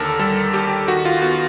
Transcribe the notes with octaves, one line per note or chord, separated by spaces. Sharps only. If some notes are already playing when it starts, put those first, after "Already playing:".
Already playing: D#2 D3 A4 A#4
G3 A4
D#2 G4
D#3 F#4
F4
B3 F#4